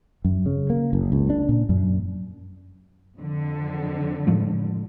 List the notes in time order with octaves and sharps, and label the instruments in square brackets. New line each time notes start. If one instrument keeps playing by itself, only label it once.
[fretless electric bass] F#2
C#3
A#3
F#1
C#2
D4
A#2
F#2
[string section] F2 D3
[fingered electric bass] A2 F3 G#3